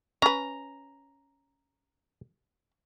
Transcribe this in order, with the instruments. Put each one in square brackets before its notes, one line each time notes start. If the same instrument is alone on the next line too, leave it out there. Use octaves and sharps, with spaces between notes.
[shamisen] C#4 B4 [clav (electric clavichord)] A#5